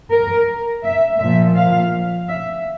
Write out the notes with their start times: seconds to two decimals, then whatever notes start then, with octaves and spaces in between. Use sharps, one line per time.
0.10 A#4
0.83 E5
1.18 A#2 F3 E5
1.55 F5
2.28 E5